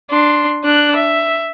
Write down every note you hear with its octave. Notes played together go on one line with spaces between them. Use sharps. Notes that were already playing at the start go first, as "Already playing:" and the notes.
D4 C6
D4 F#6
E5